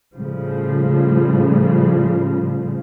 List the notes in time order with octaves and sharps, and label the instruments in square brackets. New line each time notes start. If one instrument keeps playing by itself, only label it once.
[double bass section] A2 C#3 F3 G3